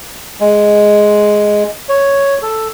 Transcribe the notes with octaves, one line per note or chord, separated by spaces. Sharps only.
G#3
C#5
A4